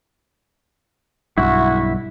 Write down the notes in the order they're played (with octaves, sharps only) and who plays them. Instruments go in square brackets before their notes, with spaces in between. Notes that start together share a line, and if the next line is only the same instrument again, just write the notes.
[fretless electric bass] B1 G2 [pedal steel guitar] E4 [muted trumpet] F#4